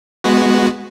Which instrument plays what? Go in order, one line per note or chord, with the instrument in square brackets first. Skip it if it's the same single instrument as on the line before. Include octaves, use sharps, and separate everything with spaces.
[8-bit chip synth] G#3 B3 F#4